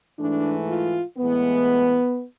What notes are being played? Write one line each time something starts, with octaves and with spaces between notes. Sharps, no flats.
G#2 E3 A3 D4
F4
A2 E3 G#3 B3